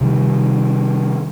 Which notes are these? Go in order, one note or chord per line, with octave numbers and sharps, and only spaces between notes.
C3 D#3 G3